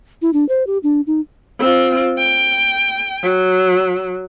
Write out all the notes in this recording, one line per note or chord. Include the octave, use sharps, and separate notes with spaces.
E4
D4
C5
G4
D4
D#4
C4 F4
G5
F#3